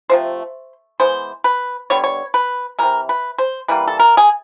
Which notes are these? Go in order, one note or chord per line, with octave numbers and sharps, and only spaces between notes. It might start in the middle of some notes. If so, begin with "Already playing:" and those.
C3 F3 A3 C5
E3 G#3 B3 C5
B4
D3 G3 B3 C#5
C#5
B4
C3 E3 G#3 A#4
B4
C5
E3 G3 A#3 B4
A4
A#4
G#4